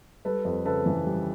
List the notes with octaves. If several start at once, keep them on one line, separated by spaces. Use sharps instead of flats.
G3 A4 B4
F2
C#3 A4 B4
E3
G3